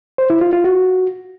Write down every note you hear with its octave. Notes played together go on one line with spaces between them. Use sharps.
C5
E4
F4
F4
F#4